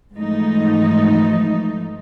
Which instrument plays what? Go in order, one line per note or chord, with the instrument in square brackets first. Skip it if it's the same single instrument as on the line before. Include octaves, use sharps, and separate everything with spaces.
[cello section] G#2 E3 F3 A3 D#4